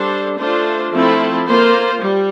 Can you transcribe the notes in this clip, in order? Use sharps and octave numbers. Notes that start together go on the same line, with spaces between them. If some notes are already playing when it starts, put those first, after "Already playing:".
Already playing: G3 D4 A4 C5
A3 D4 F4 C5
F3 A3 C4 E4 A4
A#3 F4 C5
G3